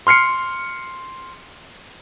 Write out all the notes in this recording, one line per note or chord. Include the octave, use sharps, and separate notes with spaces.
C6 F6 C7 C#7